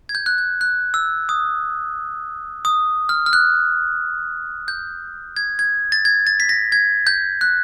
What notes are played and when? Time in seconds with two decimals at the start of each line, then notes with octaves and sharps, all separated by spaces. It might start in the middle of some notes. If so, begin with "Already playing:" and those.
0.09 G#6
0.15 G6
0.26 F#6
0.38 G6
0.61 F#6
0.94 E6
1.29 D#6
2.65 D#6
3.09 F6
3.26 F6
3.33 F#6
4.68 G6
5.36 G#6
5.59 G#6
5.92 A6
6.05 G#6
6.27 A6
6.40 B6
6.49 A#6
6.72 G#6
7.07 G6
7.41 F#6